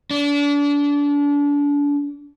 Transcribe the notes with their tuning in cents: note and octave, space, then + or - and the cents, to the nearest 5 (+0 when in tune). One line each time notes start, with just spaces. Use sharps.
D4 -30